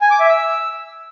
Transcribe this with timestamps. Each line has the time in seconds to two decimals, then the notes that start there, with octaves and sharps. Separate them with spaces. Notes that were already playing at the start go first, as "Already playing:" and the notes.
0.01 G#5
0.11 D6
0.20 E5
0.29 E6